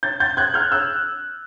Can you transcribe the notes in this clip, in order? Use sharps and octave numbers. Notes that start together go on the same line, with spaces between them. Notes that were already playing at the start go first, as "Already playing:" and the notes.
G6 A6
G6 A6
F#6 G#6
F6 G6
E6 F#6